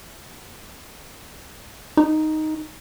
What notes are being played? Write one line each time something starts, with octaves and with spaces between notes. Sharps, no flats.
D#4